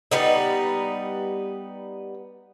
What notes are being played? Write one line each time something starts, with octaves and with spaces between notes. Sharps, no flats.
G3 B3 D#4